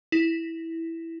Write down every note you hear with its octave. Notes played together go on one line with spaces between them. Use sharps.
E4